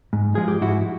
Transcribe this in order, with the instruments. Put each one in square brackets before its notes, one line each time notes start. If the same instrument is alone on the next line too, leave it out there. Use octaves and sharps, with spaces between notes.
[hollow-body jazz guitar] G#2
F3 G#3 G#4
G4
G#2 E4 F#4